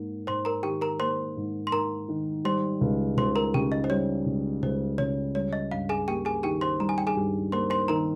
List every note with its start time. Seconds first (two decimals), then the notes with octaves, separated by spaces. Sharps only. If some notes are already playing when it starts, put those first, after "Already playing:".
Already playing: G#2 A#3
0.27 G#2 C5 C6
0.45 A#4 A#5
0.63 D#3 G4 G5
0.81 A#4 A#5
1.00 A#3 C5 C6
1.36 G#2
1.67 C6
1.72 G#2 A#4 A#5
2.09 D#3
2.45 G3 C5 C6
2.81 C#2
3.17 C#2 C5 C6
3.35 A#4 A#5
3.54 C#3 G4 G5
3.72 D#5
3.84 C5
3.90 G3 C#5
4.26 C#2
4.62 C#2 C5
4.98 C#3 C#5
5.35 G3 C#5
5.53 D#5
5.71 G2 F5
5.89 G#4 G#5
6.08 A#3 G4 G5
6.25 G#4 G#5
6.43 D#3 G4 G5
6.61 C5 C6
6.79 G3 A#5
6.89 G#5
6.98 G5
7.07 G#4 G#5
7.16 G2
7.52 A#3 C5 C6
7.70 C5 C6
7.88 D#3 A#4 A#5